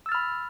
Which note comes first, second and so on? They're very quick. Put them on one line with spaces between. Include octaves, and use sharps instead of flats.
E6 A6 F6 B5